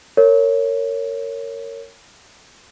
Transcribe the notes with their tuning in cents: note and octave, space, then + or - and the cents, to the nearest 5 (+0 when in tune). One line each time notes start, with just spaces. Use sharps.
A#4 -25 C#5 +0